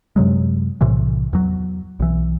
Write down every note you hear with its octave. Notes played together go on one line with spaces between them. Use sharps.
F#2 C3 F#3 G#3
B1 A2 C3 E3
E2 F#3
B1 E3